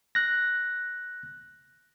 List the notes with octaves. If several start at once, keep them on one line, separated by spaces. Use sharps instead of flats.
F#6 A#6